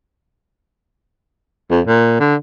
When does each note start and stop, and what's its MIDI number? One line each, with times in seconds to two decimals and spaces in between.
1.71 1.81 41
1.86 2.15 46
2.20 2.35 50